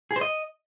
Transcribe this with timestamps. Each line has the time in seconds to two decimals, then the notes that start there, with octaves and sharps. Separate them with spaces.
0.11 G#4
0.16 C5
0.21 D#5